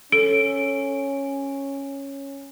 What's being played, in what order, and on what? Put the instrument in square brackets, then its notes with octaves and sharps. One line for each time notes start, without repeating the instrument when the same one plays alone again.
[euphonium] C#4 [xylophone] A4 [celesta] D7